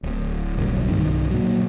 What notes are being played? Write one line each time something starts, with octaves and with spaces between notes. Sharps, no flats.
D1
D1 B1 G2
B1 G2 D#3
A#2 F#3